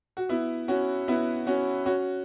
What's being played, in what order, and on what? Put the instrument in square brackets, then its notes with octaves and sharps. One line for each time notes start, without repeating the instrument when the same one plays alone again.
[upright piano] F#4
B3 E4
C#4 F#4
B3 E4
C#4 F#4
C#4 F#4